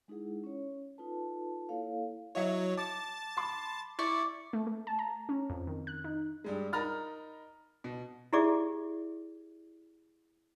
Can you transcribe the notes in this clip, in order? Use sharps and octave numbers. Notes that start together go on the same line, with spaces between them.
G#3 D#4 E4 G#4 F#5
C#4 C#5
D#4 F4 A4 B4 A5
A#3 E4 A4 C#5 F5
F#3 E4 C#5 D#5 E5
A5 D6 A6
B5 C6 D6
E4 D5 C#6
A3
A3
A5
A#5
C#4
F2
D#3
F#6
D#4
G2 G3 G#3
D#4 A#4 A#5 B5 F6 A6
B2
E4 G4 G#4 D5 E5 D6